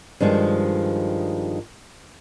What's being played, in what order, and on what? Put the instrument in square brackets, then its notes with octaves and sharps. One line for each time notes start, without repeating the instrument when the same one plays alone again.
[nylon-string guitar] G2 D#3 F3 G#3